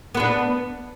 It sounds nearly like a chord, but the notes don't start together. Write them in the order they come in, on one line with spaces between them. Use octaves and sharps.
B3 B4 D4